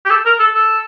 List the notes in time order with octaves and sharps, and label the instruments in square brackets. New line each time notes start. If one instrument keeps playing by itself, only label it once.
[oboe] G4
A4
A#4
A4
A4